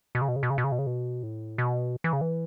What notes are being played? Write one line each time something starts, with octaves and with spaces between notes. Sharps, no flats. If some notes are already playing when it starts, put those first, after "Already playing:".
B2
C#3
B2
C#3
B2
C#3
B2
C#3
B2
C#3
B2
A2
B2
E3
C#3
E3